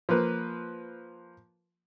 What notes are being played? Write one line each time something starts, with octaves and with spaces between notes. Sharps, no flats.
F3 A#3 B4